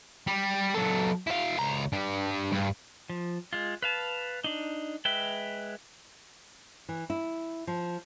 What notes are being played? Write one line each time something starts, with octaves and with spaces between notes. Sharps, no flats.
G3
F#3 A4
E4 F5
C#2 A#5
D4 G4
G2
F3
G#3 F4
B4 F5 A5
D4 D#4
G#3 B4 E5 G5
E3
E4
F3